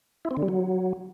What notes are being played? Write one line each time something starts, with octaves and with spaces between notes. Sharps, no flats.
E4
C4
D3
G3
F#3